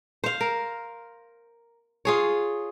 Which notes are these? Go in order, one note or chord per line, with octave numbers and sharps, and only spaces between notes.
C5 F5
A#4
F4 G#4 C#5